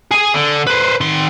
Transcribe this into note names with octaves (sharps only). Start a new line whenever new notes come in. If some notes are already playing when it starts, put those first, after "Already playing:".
G#4 G#5
D3
B4 C5
D#3 C6